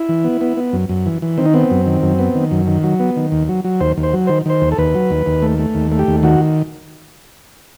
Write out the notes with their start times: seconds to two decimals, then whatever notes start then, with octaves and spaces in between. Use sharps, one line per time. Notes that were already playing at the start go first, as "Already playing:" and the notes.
Already playing: E4
0.09 E3
0.24 B3
0.41 B3
0.57 B3
0.73 F#2
0.89 F#2
1.06 E3
1.22 E3
1.38 D#3 C4
1.46 D#4
1.54 B3 C4
1.71 F#2
1.86 D#3
2.02 F#2
2.19 B3
2.35 D#3
2.51 F#2
2.68 D#3
2.84 F#3
3.00 B3
3.17 D#3
3.32 D#2
3.49 F#3
3.65 F#3
3.81 D#2 C5
3.97 D#2
4.03 C5
4.13 F#3
4.27 D#3 C5
4.46 D#3 C5
4.62 D#2
4.72 A4
4.78 D#2 B4
4.95 F#3
5.11 D#2
5.26 D#2
5.42 A3
5.59 A3
5.75 D#2
5.91 A3
5.99 G4
6.08 D#2
6.23 D#3 F#4